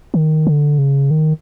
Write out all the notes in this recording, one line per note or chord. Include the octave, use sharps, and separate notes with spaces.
D#3
D3
C#3
D#3